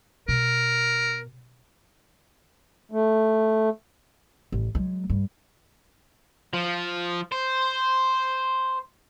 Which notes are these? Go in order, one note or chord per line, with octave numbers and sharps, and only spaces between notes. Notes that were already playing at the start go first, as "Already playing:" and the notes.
B2 A#4
A3
A1
F#3 G#3
G2
F3
C5